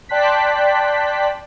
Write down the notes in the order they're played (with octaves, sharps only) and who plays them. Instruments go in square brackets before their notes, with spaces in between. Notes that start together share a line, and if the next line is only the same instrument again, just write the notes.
[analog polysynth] D5 G5 A5 C6 F#6 B6